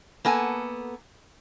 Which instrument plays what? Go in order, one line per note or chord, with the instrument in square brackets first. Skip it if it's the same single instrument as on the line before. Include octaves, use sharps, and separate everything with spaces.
[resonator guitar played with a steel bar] A#3 B3 A4 G#5